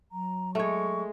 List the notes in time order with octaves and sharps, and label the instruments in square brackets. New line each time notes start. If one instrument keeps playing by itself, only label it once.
[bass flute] F#3 [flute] A#5
[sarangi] G#3 [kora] A3 C#5 [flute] C#6